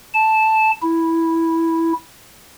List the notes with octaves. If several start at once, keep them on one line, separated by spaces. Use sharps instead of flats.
A5
E4